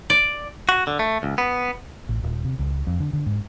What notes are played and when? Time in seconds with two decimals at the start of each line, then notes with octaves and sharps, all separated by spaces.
0.10 D5
0.69 F#4
0.87 D3
0.99 A3
1.23 C#2
1.38 B3
2.09 A1
2.23 D#1
2.44 C3
2.59 C#2
2.87 F2
3.00 D3
3.13 D3
3.26 G#2